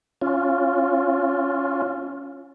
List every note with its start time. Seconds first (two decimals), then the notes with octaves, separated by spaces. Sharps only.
0.21 C#4 F4